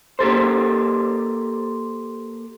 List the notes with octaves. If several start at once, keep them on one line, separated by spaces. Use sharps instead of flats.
A#3 G4 A4 C5